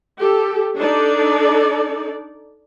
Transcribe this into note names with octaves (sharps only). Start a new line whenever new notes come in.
G4 A4
D4 D#4 A4 D5